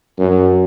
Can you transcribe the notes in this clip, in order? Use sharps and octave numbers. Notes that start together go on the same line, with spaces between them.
F#2